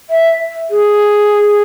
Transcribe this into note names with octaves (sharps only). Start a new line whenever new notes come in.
E5
G#4